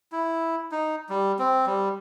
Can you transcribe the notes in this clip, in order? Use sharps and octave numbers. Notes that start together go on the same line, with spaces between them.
E4
D#4
G3
C4
G3